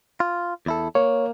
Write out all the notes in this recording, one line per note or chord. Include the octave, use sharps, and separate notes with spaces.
F4
E2 E4 A4
A#3 C#5